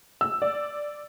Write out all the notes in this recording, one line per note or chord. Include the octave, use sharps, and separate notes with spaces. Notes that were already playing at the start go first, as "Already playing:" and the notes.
E6
D5